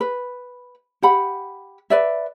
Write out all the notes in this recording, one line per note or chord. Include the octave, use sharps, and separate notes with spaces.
B4
G4 F#5 B5
B4 D5 E5